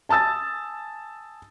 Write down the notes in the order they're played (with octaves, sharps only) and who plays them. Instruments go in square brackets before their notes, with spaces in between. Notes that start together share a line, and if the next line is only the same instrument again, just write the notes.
[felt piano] G#5 A5 D#6 E6 A6